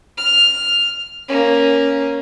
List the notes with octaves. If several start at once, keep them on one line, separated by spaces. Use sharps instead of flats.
F6
A#3 C#4